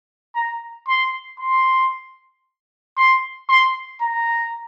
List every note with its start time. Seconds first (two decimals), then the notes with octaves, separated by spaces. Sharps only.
0.35 A#5
0.88 C6
1.40 C6
2.97 C6
3.49 C6
4.01 A#5